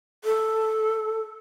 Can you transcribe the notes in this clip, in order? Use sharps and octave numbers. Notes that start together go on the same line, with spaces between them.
A4